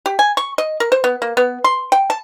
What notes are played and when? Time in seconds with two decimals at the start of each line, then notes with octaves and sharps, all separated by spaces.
0.06 G4
0.19 G#5
0.37 C#6
0.58 D#5
0.80 A#4
0.92 C5
1.04 B3
1.22 A#3
1.37 B3
1.64 C6
1.92 G5
2.10 A5